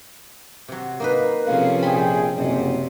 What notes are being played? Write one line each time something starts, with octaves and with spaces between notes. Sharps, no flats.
C3 F#3
A#3 D#4 B4
C3 F3 C#4 G#4 A4 F5
A#1 G#4 G5 B5 C6
F#1 C3